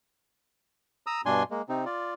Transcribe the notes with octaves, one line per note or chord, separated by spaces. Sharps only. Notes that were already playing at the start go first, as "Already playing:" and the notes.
A#5 D#6 E6
G2 B2 D4 G#5 C6
G#3 A#3
C3 C4 D#4
F4 D5